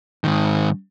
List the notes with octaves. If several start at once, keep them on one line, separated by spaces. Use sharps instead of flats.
G#2 D#3